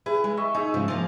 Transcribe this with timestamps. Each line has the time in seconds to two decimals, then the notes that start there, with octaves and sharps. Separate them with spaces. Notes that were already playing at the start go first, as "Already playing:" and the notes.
0.06 E4 G#4 B4
0.24 G#3
0.37 D#5 E5 C#6
0.55 D#4 G#4 E5
0.74 G#2 C#3 F3
0.88 F3 A#3